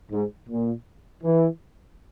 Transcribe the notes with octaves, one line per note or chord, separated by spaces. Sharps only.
G#2
A#2
E3